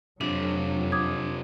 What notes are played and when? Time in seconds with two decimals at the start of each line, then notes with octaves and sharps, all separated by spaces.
0.21 F2 C3 F3 F#3 D4
0.92 D6 D#6 G#6